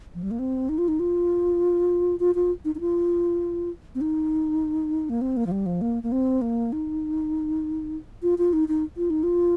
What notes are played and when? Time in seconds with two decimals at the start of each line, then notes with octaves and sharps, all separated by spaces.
0.15 F3
0.23 G3
0.31 A#3
0.39 C4
0.69 D#4
0.78 F4
0.88 D#4
1.00 F4
2.20 F4
2.35 F4
2.65 D#4
2.75 D#4
2.80 F4
3.95 C4
4.01 D#4
5.10 A#3
5.21 C4
5.37 A#3
5.46 F3
5.51 G3
5.66 F3
5.81 A#3
6.03 A#3
6.12 C4
6.41 A#3
6.72 D#4
8.23 F4
8.38 F4
8.53 D#4
8.68 D#4
8.97 F4
9.10 D#4
9.23 F4